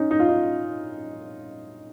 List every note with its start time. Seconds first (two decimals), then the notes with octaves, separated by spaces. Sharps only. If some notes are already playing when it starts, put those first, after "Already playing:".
Already playing: C#4 D#4
0.11 D#4
0.20 F4
0.29 D#4